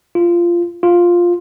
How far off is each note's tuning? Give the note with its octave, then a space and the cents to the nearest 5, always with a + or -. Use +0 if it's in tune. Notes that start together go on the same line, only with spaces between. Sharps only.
F4 -15
F4 +5